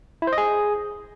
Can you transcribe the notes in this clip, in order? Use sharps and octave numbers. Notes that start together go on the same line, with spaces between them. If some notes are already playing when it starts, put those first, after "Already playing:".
E4
C5
D#5
G#4